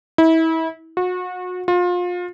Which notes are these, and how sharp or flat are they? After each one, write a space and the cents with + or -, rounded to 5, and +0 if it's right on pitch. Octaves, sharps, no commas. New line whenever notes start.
E4 -30
F#4 -30
F4 +30